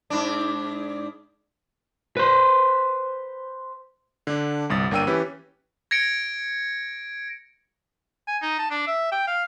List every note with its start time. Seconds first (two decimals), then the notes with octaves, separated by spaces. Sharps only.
0.10 G#2 D4
2.17 B4 C5
4.27 D3 D4
4.69 G1 C2 D#6 A6
4.91 G1 A#3 D4 G5 E6 D#7
5.07 E3 C#4 G4 B4
5.91 G#6 A#6 C#7 D7
8.27 G#5
8.42 D#4
8.59 A5
8.71 D4
8.87 E5
9.12 G5
9.27 F5